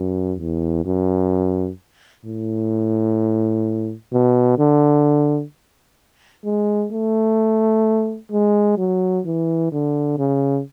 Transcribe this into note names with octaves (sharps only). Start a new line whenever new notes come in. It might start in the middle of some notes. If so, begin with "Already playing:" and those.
Already playing: F#2
E2
F#2
A2
B2
D3
G#3
A3
G#3
F#3
E3
D3
C#3